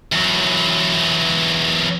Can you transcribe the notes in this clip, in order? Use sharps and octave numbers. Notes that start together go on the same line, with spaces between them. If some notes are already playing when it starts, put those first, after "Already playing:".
E2 F#3